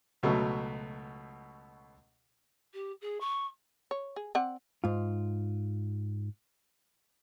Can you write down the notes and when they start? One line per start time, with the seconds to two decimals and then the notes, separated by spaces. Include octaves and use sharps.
0.23 C#2 B2 F#3 A3
2.74 G4
3.02 G#4
3.21 C#6
3.91 C#5
4.16 G#4
4.35 C4 D5 F#5
4.84 G#2 F4